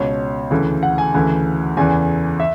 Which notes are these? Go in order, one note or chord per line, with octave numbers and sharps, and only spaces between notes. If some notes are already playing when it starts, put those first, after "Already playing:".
Already playing: C#2 B2 C#5
D2 C#3 E3
F#5
G#5
D2 C#3 E3
E2 C#3 E3 G#5
E5